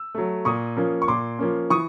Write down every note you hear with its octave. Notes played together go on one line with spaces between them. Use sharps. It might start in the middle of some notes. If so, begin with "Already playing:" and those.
Already playing: E6
F#3 A3
A#2 C#6 D#6
F3 A#3 C#4
C#6
A#2 C6 D6
F3 A#3 C#4
E3 C#6 D#6